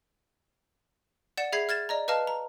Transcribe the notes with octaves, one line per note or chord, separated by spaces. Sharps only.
D5 F#5 C#7 E7
G#4 E5 B5 G#6 C7
F6 G#6 A6 E7
D5 D#5 A#5
B4 D#5 F5 A5 F6
A#5